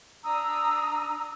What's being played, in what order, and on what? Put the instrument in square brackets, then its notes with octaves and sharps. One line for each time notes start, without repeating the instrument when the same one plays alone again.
[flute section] D4 A#5 D#6 E6